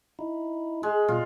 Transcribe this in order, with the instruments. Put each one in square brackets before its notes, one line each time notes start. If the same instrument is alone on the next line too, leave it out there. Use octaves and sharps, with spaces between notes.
[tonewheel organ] D#4 E4
[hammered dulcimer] G#3
[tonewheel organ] B2 G3 [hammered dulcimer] F4